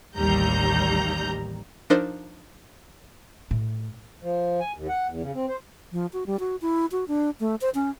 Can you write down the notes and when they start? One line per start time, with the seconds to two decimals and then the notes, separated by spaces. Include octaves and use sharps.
0.17 A1 D#2 G3 A#5 G6
1.90 F3 D4 D#4 A#4 C5
3.51 A2
4.23 F3
4.60 G#5
4.76 D#2
4.89 F#5
5.09 E2
5.22 C#3
5.34 C4
5.48 C5
5.92 F3
6.13 F#4
6.26 G3
6.40 F#4
6.62 E4
6.92 F#4
7.08 D4
7.40 A3
7.61 C5
7.75 C#4